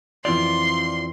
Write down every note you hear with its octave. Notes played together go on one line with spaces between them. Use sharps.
F2 E3 C4 F4 D5 C6 G6